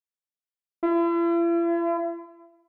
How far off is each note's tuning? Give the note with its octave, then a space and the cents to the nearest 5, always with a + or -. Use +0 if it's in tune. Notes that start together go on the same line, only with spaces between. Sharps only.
E4 +45